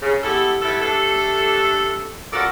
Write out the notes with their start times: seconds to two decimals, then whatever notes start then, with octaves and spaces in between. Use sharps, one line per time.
0.02 C#3
0.23 B3 E4 G4 A4
0.62 G3 B3 E4 A4
0.82 A3 D4 G4 A4
2.33 C#4 F4 F#4 A4 A#4 D5